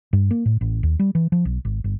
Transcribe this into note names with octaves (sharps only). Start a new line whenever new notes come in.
G2
A#3
A2
A1
D#2
G3
E3
F3
B1
G#1
G1